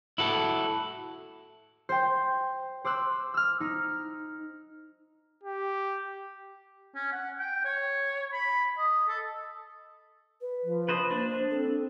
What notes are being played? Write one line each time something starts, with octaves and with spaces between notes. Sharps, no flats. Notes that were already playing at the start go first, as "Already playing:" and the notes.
E4 F#4 A4
C5 G5
C5 D6 E6 F#6
E6 F6
D#4
G4
C#4
F#5
G5
C#5
B5
D#5
A4
B4
F3
B4 C5 D#5
A#3 D4 C5
C4 A4